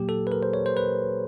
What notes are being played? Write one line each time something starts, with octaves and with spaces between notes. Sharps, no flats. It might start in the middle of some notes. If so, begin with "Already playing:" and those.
Already playing: A#2 F#3 A#3 G4
A4
B4
A#4
C5
C#5
C5
B4